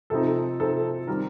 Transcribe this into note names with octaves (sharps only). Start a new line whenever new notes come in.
C3 F3 C4 D#4 A4
C3 F3 C4 D#4 A4
D#3 G3 C4 A#4